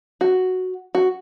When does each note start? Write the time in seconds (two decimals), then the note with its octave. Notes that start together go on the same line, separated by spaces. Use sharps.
0.21 F#4
0.95 F#4